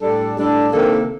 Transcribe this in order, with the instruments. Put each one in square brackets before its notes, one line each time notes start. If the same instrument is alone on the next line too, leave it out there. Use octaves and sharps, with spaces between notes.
[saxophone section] A2 G3 D4 A4
A2 G3 D4 A4
C3 D#3 A#3 D4 A4